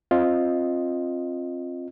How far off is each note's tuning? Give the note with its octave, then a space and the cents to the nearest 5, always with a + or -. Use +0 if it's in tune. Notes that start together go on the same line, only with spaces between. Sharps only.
C4 +20 F4 +0 D#5 +0